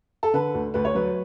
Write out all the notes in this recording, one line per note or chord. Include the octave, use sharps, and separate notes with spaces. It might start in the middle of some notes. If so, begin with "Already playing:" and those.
A4
D3 B4
D2
D2 B4
C#5
F#3 B4